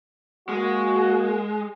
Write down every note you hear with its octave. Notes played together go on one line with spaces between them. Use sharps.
G#3 A#3 F#4